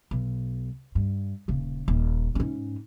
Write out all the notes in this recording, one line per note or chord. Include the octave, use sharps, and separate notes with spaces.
B1
G2
D#1 C#3
D#1
G#2 C#4